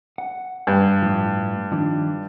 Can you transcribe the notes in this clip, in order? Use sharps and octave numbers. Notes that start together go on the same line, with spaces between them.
F#5
G2
A2 F3
D#3 F3 D4